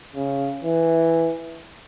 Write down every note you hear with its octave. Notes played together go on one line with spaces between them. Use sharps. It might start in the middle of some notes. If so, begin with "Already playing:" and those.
C#3
E3